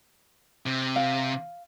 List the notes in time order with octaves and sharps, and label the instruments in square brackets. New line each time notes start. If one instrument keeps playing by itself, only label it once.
[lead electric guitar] C3
[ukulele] F5